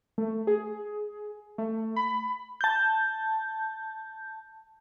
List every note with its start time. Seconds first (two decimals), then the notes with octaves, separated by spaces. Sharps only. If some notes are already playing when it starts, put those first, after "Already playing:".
0.18 A3
0.47 G#4
1.58 A3
1.96 B5
2.61 A5 G6